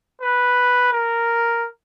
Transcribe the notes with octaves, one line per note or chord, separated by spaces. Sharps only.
B4
A#4